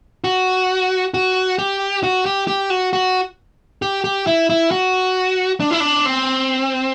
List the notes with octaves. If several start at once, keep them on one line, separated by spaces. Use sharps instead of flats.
F#4
F#4
G4
F#4
G4
G4
F#4
F#4
G4
G4
E4
E4
F#4
D4
E4
D4
C4